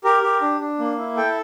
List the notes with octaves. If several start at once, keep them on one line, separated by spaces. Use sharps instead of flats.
G4 A#4
G4
D4
D4
A#3
E4
A4 G5